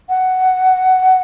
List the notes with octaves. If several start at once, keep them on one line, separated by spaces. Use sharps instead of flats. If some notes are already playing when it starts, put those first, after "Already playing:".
F#5